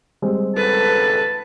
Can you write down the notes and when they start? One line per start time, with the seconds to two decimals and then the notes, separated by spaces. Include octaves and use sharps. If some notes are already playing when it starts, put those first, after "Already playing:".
0.22 G3 G#3 C4
0.56 G#1 C#2 A4 B4 A5